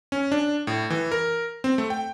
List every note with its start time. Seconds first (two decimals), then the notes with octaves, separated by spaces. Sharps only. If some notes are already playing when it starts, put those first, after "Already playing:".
0.12 C#4
0.32 D4
0.67 A2
0.90 E3
1.12 A#4
1.64 C4
1.78 A3
1.90 G5